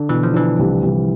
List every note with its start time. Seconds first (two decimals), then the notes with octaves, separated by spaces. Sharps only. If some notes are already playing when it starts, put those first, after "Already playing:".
Already playing: D3 D4
0.09 B2 E3
0.23 F3
0.34 E3 D4
0.59 C2
0.83 C2